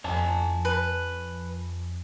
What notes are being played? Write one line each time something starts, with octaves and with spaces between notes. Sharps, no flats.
F2 C#5 G#5 A5
B4